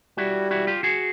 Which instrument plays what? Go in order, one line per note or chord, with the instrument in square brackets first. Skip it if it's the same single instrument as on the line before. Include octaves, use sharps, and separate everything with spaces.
[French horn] G3 [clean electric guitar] E4 F#4
[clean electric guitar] E4 F#4
F4 G4
F#4 G#4